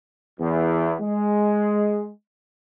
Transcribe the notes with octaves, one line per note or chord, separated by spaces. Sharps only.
E2
G#3